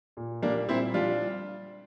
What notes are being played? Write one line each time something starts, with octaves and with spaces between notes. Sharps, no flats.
A#2
G3 A#3 D4
A#2 C4 E4
G3 D4 F4